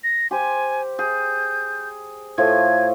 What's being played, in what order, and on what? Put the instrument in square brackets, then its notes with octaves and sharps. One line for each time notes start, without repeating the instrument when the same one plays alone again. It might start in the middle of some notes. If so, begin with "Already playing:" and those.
[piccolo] A#6
[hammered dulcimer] G4 C5 [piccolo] G#5
[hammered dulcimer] G#4 [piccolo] G6
[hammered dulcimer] A2 F3 A3 [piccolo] G#6